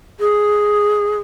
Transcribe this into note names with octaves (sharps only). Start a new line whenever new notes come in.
G#4